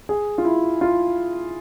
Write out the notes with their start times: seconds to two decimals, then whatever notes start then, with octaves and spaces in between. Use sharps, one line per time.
0.09 G#4
0.38 F4
0.45 E4
0.81 F4